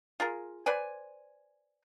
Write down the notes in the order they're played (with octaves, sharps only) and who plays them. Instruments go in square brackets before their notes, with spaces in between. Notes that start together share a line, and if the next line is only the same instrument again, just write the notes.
[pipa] F4 G#4 A#4
B4 C5 D5 G#5